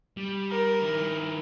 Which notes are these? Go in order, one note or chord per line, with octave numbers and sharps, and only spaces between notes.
G3
A#4
D#3 E4